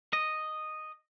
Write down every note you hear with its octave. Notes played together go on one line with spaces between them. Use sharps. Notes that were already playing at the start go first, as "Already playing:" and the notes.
D#5